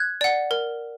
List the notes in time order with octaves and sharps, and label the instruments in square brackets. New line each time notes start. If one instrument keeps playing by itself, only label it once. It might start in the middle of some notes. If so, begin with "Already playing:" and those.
Already playing: [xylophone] F#6 G#6
D5 F#5
A#4